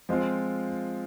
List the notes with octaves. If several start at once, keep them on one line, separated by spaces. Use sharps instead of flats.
F3 G#3 C4 F4